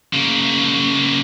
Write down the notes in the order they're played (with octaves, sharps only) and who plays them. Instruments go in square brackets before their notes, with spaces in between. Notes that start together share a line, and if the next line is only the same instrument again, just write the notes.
[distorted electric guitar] C#3 A#3